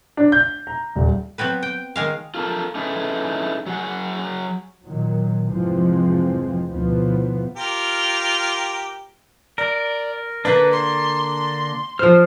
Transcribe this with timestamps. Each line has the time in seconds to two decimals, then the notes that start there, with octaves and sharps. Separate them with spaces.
0.17 D4
0.32 G6
0.67 A#5
0.95 D#1
1.38 F#3 B3 C4 B4
1.63 G5
1.96 D#3 G#3 F5
2.34 F4 A4 A#4 A5
2.75 C#4 D#4 E4 G#4 A4 B4
3.66 F#3 F#4 G#4 F#5
4.84 A#2 D#3 F#3
5.49 F1 G#2 E3 F3 G#3 C4
6.69 D2 G#2 B2 E3 F3 B3
7.57 F4 G4 A#4
9.58 A#4 D5
10.45 D3 A#3 D4 B4
10.72 C6
11.99 F3 C5 F6